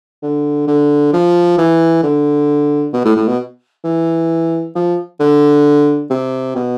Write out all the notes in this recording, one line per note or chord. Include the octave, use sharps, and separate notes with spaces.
D3
D3
F3
E3
D3
B2
A2
A2
B2
E3
F3
D3
C3
B2